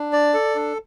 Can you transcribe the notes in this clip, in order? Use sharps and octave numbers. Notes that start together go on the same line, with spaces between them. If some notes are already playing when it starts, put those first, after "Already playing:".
Already playing: D4
D5
A4
D4